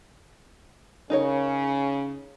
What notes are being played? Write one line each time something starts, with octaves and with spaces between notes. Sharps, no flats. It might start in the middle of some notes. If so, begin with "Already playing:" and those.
C#3 D#4 A#4 C#5